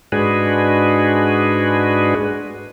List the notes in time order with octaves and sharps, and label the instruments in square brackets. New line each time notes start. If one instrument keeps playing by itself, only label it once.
[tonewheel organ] G#2 G#3 D4 F#4 G#4 B4